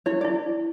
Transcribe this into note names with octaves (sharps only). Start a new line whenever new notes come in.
E4 C#5
D5
E4